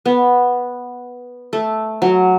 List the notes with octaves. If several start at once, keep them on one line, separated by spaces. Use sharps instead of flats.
B3
A3
F#3